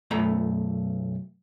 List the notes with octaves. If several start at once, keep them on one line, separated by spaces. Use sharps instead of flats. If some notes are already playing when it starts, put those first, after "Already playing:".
B1 F#2 A3 A#5 B5